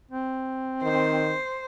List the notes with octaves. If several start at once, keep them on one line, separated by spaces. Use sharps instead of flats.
C4
D#3 C5